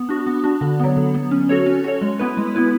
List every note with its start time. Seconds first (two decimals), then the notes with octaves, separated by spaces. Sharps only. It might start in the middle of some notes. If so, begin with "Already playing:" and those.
Already playing: B3
0.09 D4 F#4
0.27 B3
0.44 D4 F#4
0.61 D3
0.80 F#3 B3
0.97 D3
1.14 F#3 B3
1.31 C#4
1.49 F#4 A4 C#5
1.66 C#4
1.84 F#4 A4 C#5
2.01 G#3
2.19 B3 E4 B4
2.37 G#3
2.55 B3 E4 B4